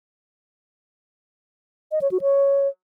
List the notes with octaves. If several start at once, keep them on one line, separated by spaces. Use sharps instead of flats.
D#5
C#5
F#4
C#5